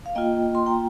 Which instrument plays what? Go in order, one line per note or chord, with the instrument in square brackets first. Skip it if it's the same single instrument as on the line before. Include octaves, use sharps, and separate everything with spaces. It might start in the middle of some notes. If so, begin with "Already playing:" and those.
[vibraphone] F5
A#3 F4 D#5 G5
C6
G5 A#5